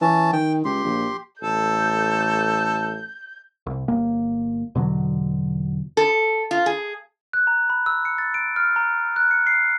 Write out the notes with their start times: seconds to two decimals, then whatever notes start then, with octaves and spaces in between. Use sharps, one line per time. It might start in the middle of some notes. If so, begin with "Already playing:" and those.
0.01 E3 C#4 A5
0.33 D#3 G5
0.65 C#2 G4 C6
0.84 A#1
1.42 A1 A4 G6
3.66 C2
3.88 G1 A#3
4.75 E2 B2 D3 F#3
5.97 A4
6.51 F4
6.66 G#4
7.33 F#6
7.47 A#5
7.70 B5
7.86 E6
8.05 C#7
8.18 A6
8.34 D7
8.56 F6
8.76 A#5
9.16 F#6
9.31 C#7
9.47 C7